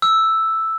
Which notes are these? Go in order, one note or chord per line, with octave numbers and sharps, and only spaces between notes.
E6